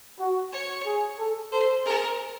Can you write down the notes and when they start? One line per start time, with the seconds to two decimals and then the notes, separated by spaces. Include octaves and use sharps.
0.19 F#4
0.53 C#5
0.86 G#4
1.19 A4
1.52 A4 C5
1.85 G#4 A#4